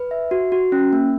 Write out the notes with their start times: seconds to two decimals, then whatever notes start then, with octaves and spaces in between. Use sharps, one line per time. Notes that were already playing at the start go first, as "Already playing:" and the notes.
Already playing: B4
0.11 E5
0.31 F#4
0.52 F#4
0.72 C#4
0.93 A#3